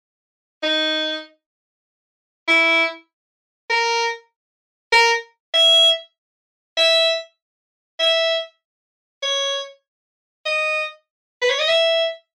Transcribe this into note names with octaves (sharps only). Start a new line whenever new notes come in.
D#4
E4
A#4
A#4
E5
E5
E5
C#5
D#5
B4
C#5
D#5
E5